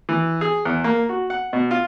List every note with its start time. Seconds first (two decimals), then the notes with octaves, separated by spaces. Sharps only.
0.09 E3
0.41 G#4
0.65 E2
0.84 A#3
1.09 F#4
1.30 F#5
1.53 B2
1.71 F4